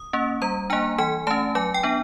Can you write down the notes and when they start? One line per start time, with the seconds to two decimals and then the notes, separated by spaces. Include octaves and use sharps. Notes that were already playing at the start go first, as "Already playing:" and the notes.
Already playing: D#6
0.13 A#3 C#4
0.42 G3 A#5
0.70 A#3 D4 G#5
0.98 E3 G#5
1.27 A3 C#4 A5
1.55 F#3 G#5
1.74 G5
1.83 B3 D4